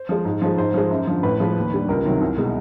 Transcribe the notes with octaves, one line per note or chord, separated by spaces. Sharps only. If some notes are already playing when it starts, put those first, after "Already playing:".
Already playing: C5
F3 G#3
G#2
F3 G#3
G#2 C5
F3 G#3
F#2
D3 F3
A2 B4
F3 G#3
D#2
D3 G3
C#2 A#4
C3 D#3 F#3
C2
B2 G#3